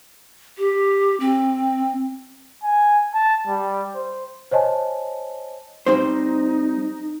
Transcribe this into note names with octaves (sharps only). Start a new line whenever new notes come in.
G4
C4
G#5
A5
G3
C5
C5 C#5 D#5 G#5 A5
G3 C4 D#4 C5